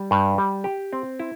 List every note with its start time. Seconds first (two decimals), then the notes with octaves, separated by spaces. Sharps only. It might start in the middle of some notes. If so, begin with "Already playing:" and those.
Already playing: G3
0.11 G2
0.38 G3
0.64 G4
0.93 C4
1.20 E4